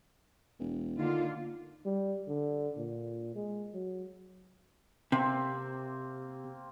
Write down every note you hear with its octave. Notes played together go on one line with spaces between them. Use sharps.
E1
D3 D#3 A#3 F4
G3
D3
A#2
G#3
F#3
C3 A#3 C4